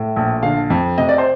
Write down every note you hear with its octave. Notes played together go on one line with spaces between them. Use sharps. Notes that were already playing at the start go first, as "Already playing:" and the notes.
Already playing: A2
A#1
D3 F5
F2
C3 D#5
D5
C5